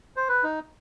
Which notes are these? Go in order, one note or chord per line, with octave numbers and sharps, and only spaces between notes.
C5
B4
D#4